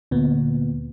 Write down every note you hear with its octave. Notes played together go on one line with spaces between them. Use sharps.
D2 A#2 B3